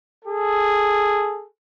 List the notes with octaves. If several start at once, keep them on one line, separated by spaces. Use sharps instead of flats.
G#4 A4